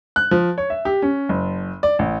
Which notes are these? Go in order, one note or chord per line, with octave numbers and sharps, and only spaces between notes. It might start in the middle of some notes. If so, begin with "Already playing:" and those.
F#6
F3
C#5
E5
G4
C#4
F#1
D5
A1